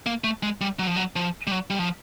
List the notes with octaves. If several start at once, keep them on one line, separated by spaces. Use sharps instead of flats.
A#3
A3
G#3
G3
F#3
F3
F#3
F3
G3
F#3
G3
F3